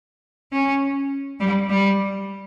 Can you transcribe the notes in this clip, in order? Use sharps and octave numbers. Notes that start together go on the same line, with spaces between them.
C#4
G3
G3